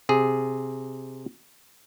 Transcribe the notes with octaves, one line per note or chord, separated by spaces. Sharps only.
C3 G#4